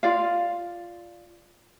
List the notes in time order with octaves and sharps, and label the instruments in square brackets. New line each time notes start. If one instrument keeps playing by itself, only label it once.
[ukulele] F4 D5 F5